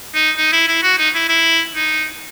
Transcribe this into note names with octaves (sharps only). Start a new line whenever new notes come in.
D#4
D#4
E4
E4
F#4
D#4
E4
E4
D#4